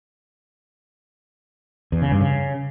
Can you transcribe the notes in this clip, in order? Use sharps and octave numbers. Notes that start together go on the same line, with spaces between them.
E2
C#3
G2
C#3